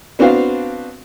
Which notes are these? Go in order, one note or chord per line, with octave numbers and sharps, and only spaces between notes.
B3 C4 D4 F#4 F5